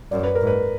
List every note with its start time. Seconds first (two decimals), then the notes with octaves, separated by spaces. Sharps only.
0.11 F#2 D5
0.23 B4
0.35 A#4
0.41 G#2
0.47 B4